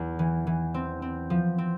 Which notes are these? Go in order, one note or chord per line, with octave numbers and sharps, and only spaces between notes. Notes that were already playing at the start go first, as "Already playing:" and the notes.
Already playing: E2
E3
E3
C4
C4
F3
C4